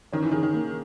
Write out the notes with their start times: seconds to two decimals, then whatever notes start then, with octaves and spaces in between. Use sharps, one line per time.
0.13 D#3 C#4
0.22 E3
0.32 D#3 G#4
0.43 D#3
0.53 A#3